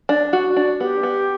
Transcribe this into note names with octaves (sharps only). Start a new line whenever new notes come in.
D4
F#4
D4
B3 G4
B3